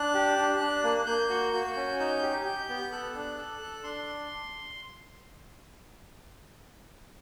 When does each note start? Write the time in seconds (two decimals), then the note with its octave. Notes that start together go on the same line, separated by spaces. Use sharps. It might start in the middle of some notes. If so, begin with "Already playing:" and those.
Already playing: D4 F#6
0.15 G4
0.38 D4
0.60 D4
0.84 A#3
1.06 A#3 G6
1.30 F#4
1.53 F#4
1.77 C#4
1.99 D#4 G6
2.22 G4
2.45 G4
2.69 B3
2.92 A4 F#6
3.14 D4
3.38 A4
3.61 A4
3.83 D4 C6